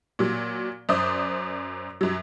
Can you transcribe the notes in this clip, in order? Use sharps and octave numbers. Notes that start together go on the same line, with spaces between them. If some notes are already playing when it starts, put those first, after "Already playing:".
A#2 F#3
F#2 C5 D5 D#6
F#2 F#3